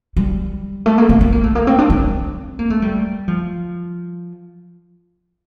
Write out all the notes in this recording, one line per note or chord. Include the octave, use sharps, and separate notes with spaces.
G3
A3
A#3
C4
C4
A#3
A3
A#3
C4
D4
C4
A#3
A3
G3
F3